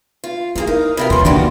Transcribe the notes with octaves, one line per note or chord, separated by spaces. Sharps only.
F4
F#2 A#3 E4 G#4
D#4 A#4
C3 F4 A#4 B5
D#2 B2 E3 C#4 C6
C#2 D#3 E3 A#3 D4 F#4 G4